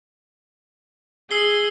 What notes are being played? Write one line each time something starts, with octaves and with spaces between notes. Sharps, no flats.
G#4 E6 C7 G7